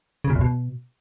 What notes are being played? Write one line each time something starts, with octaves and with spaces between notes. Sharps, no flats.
C#3
A#2
E2
B2